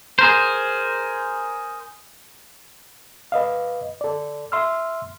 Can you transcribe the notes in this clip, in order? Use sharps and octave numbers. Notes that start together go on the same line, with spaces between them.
G#4 A#4 C5
B4 D#5 F5
A4 D5
E5 C6 E6 F6